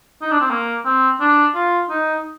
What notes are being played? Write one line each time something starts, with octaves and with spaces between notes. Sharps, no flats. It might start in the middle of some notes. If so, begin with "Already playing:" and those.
D#4
D4
C4
A#3
C4
D4
F4
D#4